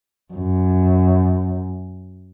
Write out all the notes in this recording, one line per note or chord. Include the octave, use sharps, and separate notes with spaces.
F#2